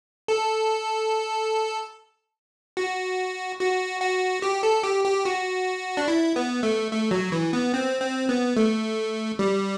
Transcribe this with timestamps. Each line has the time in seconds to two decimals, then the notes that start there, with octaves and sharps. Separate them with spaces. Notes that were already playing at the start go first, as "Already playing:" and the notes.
0.28 A4
2.77 F#4
3.60 F#4
4.01 F#4
4.42 G4
4.63 A4
4.83 G4
5.05 G4
5.25 F#4
5.97 D4
6.08 E4
6.36 B3
6.63 A3
6.91 A3
7.11 F#3
7.32 E3
7.53 B3
7.74 C4
8.01 C4
8.29 B3
8.57 A3
9.39 G3